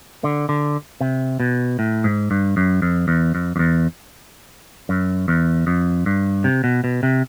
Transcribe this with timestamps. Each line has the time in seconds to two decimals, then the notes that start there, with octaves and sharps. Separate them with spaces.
0.24 D3
0.49 D3
1.01 C3
1.40 B2
1.79 A2
2.04 G#2
2.31 G2
2.57 F#2
2.82 F2
3.08 E2
3.35 F2
3.56 F2
3.59 E2
4.89 F#2
5.28 E2
5.67 F2
6.06 G2
6.44 C3
6.64 B2
6.84 B2
7.03 C3